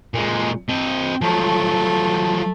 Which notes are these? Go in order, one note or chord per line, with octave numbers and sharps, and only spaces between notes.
A#2 G#3
C4 D#5
F3 F#3 A3